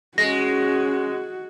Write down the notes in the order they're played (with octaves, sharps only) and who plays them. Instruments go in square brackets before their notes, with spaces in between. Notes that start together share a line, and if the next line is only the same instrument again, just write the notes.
[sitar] G#3 [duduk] C#4 [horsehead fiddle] F#4 [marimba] A#6